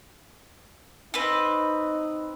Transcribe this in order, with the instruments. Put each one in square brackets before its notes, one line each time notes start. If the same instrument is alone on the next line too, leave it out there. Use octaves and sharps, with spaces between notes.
[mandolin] C4 B4 [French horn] D#4